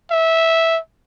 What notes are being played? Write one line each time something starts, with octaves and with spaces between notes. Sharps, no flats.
E5